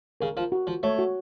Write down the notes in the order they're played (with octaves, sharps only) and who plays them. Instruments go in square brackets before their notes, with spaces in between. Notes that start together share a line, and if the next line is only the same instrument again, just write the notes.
[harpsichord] C#3 [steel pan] A#4
[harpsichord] F3 [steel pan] A#4
[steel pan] F#4
[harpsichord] F3 [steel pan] F#4
[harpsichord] A3 [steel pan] C#5
[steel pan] F#4